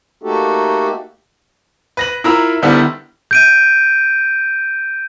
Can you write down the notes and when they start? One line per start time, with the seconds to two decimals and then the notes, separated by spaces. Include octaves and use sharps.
0.23 A3 A#3 D#4 F#4 G4 A4
1.97 B4 A#6 F#7
2.24 E4 F4 A#4 A#5 B5 E6
2.62 D3 D#3 G3 B3 E4 A4
3.31 G6 D7 D#7